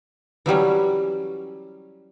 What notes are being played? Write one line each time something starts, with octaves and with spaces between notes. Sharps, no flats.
E3 F#3 G3 C#4